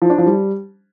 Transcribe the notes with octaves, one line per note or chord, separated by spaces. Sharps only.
F3
D4
F3
G3